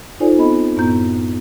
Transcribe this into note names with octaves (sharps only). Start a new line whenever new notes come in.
D#4 F4 A4 C5 D5 G#5
B3 C4 A4 D#5 B5
F#2 A2 B3 E4 A#5 G6